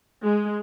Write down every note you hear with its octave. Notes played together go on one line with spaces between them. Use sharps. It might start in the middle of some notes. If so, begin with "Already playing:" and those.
G#3